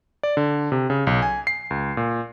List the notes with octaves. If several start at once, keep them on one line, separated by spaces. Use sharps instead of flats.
D5
D3
C3
C#3
B1
G#5
C7
C#2
A#2